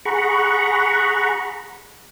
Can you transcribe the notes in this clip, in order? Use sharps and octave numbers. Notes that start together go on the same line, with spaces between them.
G#4 F#5 A#5 B5 C#6